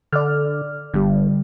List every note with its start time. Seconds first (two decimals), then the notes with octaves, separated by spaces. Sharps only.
0.13 D3 D5 F6
0.94 G1 D3 G3